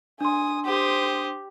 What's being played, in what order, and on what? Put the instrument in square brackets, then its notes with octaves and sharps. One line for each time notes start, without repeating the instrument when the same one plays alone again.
[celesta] D4 C6 [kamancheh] G#5 D#6
[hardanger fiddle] G4 [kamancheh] C5 D#6